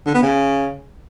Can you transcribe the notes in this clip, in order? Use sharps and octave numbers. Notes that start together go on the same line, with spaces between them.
D3
B3
C#3